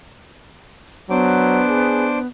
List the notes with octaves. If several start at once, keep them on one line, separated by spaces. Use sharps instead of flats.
F#3 B3 D4 C5 D6
G#4